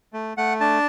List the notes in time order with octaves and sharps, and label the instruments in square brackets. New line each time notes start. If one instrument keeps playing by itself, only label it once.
[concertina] A3
A3 F#5
D4 A5